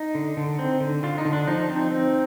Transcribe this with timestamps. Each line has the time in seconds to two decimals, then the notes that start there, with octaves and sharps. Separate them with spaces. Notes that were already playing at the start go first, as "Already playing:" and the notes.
Already playing: D#4
0.15 D3
0.37 D3
0.59 C4
0.81 D3
1.03 D3 F4
1.18 D#4
1.25 D3
1.33 D4
1.47 F3 D#4
1.69 C4
1.91 C4